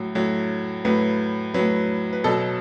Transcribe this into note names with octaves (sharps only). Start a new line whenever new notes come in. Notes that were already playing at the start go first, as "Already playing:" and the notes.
Already playing: A2 F#3
A2 F#3
A2 F#3 B4
A2 F#3 B4
B4
B2 F#3 A4